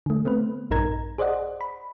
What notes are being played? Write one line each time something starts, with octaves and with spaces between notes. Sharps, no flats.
D3 A3
A3 B3 C4 B4
A#1 G2 D#4 A#4 A#5 G#6
G#4 C5 D5 D#5 F#5
B5